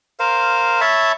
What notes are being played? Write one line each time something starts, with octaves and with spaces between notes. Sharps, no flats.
A#4 C5 F5
C#5 E5 A5 B5